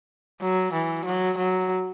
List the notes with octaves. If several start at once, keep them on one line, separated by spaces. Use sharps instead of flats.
F#3
E3
F#3
F#3